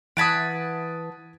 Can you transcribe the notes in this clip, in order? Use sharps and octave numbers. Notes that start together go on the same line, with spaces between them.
E3 F#5 A5 B5 D#6 G#6 D7